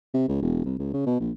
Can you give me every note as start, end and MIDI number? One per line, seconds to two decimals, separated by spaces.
0.14 0.27 48
0.29 0.41 37
0.42 0.63 28
0.65 0.76 36
0.79 0.90 37
0.94 1.04 49
1.06 1.18 47
1.20 1.32 34